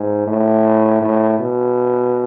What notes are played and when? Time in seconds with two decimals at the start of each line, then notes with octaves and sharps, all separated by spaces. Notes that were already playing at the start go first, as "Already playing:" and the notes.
Already playing: G#2
0.27 A2
1.02 A2
1.39 B2